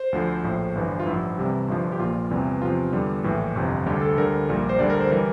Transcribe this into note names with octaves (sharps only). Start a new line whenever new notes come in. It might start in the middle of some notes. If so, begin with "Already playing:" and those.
Already playing: C5
D2 D3 F3
A#1 A2 F3
G1 G2 E3
F4
A1 G2 F3 E4
C2 C3 E3 G3
G1 G2 F3
G4
A#1 A#2 F3 F4
E2 C3 E3 G3
E2 C3 F3 F4
E2 D3 G3
A#1 A2 E3
G1 F2 C3
D2 D3 G3 G4
A4
D2 D3 G3 A#4
A#1 A#2 G3
C5
D2 D3 G3 D5
A#4
C5
E3 G3 A#4